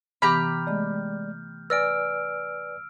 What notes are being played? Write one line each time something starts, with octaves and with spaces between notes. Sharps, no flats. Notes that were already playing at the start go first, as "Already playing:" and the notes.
C3 E3 B3 G4 A#5 B5 F6 G6
G#3 A3 D5 D#5
B4 D5 G#5 E6 F6 A6 A#6 D7